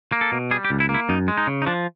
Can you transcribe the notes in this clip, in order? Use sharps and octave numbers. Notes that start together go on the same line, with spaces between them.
A#3
A4
B2
G3 G#4
G4
C#2
E4
A#3
E4
F#2 D#4
G#3
D#4
C#3
D#4
F3 D4